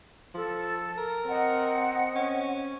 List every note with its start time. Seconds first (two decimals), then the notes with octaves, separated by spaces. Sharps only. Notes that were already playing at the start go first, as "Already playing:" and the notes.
0.35 F3 A4
0.98 A#4
1.28 C4 D#5 F#5
2.15 C#4